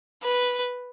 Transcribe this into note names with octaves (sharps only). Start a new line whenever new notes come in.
B4